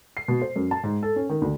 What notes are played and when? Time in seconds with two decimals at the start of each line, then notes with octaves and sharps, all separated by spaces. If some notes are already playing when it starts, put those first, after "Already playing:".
0.17 C7
0.28 B2
0.41 C5
0.56 F#2
0.71 A5
0.83 G#2
1.03 A4
1.16 C#4
1.29 D#3
1.42 D2